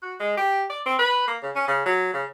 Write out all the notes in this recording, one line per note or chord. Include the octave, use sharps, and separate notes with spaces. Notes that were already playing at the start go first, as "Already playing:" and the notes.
F#4
G#3
G4
D5
C4
B4
A#3
C#3
C#4
C#3
F#3
C#3